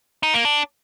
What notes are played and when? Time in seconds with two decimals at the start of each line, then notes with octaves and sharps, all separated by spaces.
0.23 D#4
0.34 A#3
0.45 D4